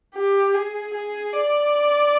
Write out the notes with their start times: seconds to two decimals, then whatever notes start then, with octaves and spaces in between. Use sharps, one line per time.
0.15 G4
0.55 G#4
0.93 G#4
1.32 D5